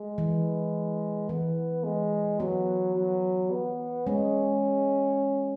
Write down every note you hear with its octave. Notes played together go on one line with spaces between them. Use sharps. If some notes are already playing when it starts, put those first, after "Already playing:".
Already playing: G#3
E3
E3 B3
G#3
F#3 B3
F#3
B3
G#3 C#4